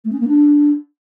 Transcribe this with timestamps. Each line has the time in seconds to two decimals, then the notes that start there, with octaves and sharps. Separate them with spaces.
0.04 A3
0.12 C#4
0.20 A#3
0.28 D4